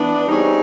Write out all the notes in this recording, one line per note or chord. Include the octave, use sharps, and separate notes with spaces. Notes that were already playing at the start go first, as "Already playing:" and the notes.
Already playing: E3 B3 D4
G3 C4 D#4 G#4 C#5